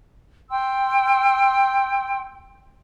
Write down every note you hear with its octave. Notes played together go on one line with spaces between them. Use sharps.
G5 C6 E6